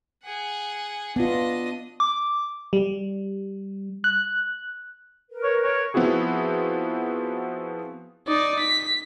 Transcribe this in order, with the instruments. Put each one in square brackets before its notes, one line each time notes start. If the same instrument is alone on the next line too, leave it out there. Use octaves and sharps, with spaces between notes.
[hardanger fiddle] G#4 F#5
[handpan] B3 F4 [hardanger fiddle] D4 D#5
[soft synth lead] D6
[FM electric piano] G3
F#6
[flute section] A#4 B4
[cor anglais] C#5
C#5
[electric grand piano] F3 B3 C4 E4 F#4 G#4
[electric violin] D#4 D5
B6